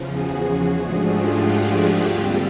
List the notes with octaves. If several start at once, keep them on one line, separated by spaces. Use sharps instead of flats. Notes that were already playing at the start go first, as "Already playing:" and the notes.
Already playing: E2 C#3 F3
F#4 G#4
G#2 F3 A3 D4
F4 G4
F#4 G#4
F#4 G#4
D#2 D3 G3 C4 F4 G4